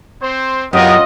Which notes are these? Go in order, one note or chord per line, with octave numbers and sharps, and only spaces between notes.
C4 C5
F#2 B3 F4 G4 A#4 D#5